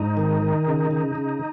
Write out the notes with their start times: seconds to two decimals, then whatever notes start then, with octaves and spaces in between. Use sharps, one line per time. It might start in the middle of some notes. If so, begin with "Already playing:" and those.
Already playing: G#2 D#4
0.17 D#3
0.42 D#3
0.67 C#3
0.91 C#3
1.15 C#3